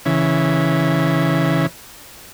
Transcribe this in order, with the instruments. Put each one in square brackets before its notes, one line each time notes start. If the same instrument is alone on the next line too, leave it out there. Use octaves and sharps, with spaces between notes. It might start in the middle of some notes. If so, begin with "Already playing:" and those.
[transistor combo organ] C#3 E3